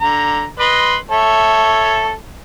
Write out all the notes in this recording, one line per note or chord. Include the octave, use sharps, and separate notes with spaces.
D3 A#5
B4 D#5 C6
A4 C#5 E5